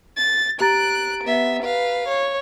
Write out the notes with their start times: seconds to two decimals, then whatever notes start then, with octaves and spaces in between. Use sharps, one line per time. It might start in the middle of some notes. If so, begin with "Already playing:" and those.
0.17 A6
0.61 G4 A#5 F#6 A6 D7
1.24 B3 E5
1.63 B4 F5
2.08 C#5